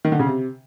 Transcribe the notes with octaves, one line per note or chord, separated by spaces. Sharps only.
D#3
D3
C#3
C3